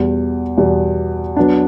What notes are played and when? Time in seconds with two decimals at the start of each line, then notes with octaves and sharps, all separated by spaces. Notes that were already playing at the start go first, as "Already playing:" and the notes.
Already playing: E2 B2 G3
0.58 E2 B2 G3
1.36 F#3 B3 D4